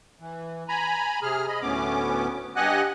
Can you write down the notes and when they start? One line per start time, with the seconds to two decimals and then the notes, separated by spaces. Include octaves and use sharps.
0.20 E3
0.68 G#5 A#5 B5
1.22 C3 G#4 F6
1.48 D#5 B5
1.62 D2 A2 B3 C#4 D6
2.56 G2 G4 D#5 F#5 G#5 F#6